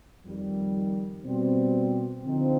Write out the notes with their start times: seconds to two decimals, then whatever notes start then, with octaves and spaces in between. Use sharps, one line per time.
0.24 F2 D#3 G3
1.24 B2 G3 C4
2.24 D3 F3 C4 D#4